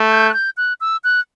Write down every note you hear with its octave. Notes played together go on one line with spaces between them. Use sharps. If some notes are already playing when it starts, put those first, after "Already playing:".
Already playing: A3
G6
F#6
G6
F#6
E6
F#6